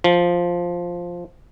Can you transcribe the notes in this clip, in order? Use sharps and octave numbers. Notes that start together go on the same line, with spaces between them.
F3